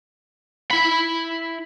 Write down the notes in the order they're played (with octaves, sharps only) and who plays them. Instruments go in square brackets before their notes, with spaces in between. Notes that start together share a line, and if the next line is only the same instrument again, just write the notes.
[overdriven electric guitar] E4 B5